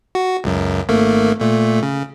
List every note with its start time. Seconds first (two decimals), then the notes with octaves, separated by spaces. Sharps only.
0.15 F#4
0.44 C#2 F#2
0.89 G#1 A3 A#3
1.40 A#2 A3
1.83 C#3